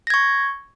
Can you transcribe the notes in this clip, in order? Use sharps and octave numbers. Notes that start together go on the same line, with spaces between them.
C#6 G#6 A#6